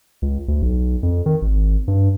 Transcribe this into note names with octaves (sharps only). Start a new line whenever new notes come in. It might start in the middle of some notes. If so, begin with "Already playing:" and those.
C#2
D2
B1
F2
D#3
G#1
G2